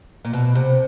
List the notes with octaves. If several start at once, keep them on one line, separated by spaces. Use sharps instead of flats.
A#2
B2
C3